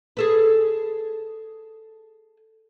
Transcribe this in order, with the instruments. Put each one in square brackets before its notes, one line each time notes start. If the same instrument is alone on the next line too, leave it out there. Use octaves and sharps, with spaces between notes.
[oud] G#4 A4 B4